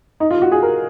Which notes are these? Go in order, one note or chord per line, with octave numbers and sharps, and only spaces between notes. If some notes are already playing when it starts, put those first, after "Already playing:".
D#4
F4
F#4
G#4
A#4